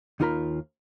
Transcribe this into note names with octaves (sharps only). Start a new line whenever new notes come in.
D#2 D#4 F4 A#4 A#5 B5